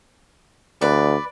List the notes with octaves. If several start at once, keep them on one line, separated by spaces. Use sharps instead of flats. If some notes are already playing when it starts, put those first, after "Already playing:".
D2 B4 D5